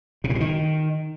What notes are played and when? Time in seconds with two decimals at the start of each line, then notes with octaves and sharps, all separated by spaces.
0.24 C3
0.30 A2
0.35 B2
0.40 D#3